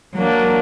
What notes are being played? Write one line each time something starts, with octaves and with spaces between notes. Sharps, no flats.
F#3 A#3 D4